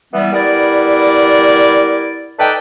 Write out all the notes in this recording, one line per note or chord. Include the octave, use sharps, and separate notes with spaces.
E3 G3 B3
G3 B3 E4 A#4 D5
D#4 A4 B4 D5 G5